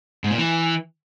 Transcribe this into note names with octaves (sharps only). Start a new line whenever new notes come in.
G#2
A#2
E3